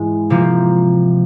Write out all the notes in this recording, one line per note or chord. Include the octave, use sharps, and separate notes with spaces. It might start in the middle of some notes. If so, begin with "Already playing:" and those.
Already playing: G#2 E3 G#3
C3 F3 A#3